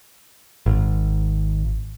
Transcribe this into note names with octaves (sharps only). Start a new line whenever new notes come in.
G#1